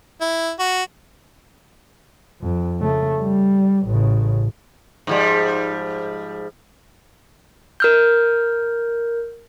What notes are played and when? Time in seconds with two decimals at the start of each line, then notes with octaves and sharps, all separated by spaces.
0.21 E4
0.59 F#4
2.41 F2
2.80 C#3 A3
3.21 G3
3.87 A1 C#3
5.07 G#2 F3 G3
7.80 A#4 F6 G6